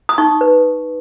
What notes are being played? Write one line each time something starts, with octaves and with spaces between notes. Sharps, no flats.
D#6
D#4 C#6
B4